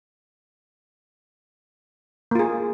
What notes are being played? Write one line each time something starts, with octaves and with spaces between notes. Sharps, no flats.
A#3 F4 G#4